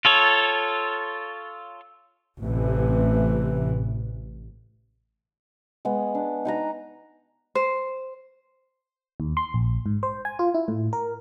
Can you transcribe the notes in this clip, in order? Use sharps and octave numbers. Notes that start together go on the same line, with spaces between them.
F4 A4 C#5
A1 C3 E3
G#3 B3
D4
D#4 B4 A#5
C5
D#2
C6
A#1
G#2
C5
G#5
F4
E4
A2
A#4